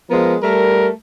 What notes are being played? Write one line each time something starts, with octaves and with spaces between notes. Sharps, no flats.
F3 G#3 B3 A#4
G3 A3 A#4